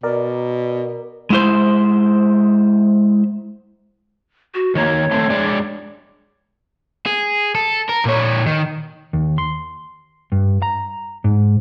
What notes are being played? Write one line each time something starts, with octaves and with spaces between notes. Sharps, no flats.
B2 A#4 D5
G#3 E4 C5
F#4
D#3 A#3 C#5
A3 C4
G#3 D4 D5
G#4
A4
A#4
A#2 C#5
D#3
D#2
C6
G2
A#5
G#2